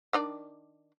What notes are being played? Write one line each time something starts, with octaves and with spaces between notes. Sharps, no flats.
D#3 D4 D5